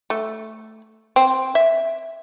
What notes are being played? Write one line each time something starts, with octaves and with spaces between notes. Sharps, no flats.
A3
C4
E5